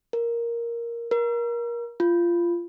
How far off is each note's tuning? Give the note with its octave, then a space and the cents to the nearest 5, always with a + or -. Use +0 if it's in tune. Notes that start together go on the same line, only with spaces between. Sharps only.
A#4 +5
A#4 +25
F4 -20